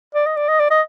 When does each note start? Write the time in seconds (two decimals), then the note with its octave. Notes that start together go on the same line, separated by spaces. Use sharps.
0.15 D5
0.26 D#5
0.37 D5
0.48 D#5
0.60 D5
0.70 D#5